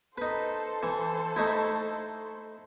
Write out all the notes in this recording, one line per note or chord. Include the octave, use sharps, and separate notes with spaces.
D#4 A4 B4 C5
E3
A3 D#4 E4